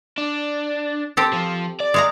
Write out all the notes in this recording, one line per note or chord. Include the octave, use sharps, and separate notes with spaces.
D4
C4 G4 A4
F3
D5
G#3 F5 A#5